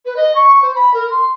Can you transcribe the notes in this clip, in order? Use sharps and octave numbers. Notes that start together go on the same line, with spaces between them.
B4
D#5
C#6
C5
B5
A#4
C6